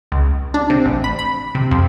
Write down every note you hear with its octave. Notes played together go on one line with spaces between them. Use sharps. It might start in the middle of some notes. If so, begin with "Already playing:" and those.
C#2
D4
C3
A1
B5
B5
C3
F2